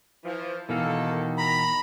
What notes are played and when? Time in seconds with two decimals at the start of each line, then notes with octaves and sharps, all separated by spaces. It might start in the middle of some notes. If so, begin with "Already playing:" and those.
0.24 E3 F3
0.69 B2 D#3 E3 A#3 E4 A4 F5
1.38 A#5 B5